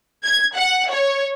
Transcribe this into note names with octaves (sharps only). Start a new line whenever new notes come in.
G#6
F#5
C#5